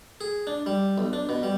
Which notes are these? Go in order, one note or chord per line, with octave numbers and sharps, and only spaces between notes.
G#4
D4
G3
B1
D4
B2
G3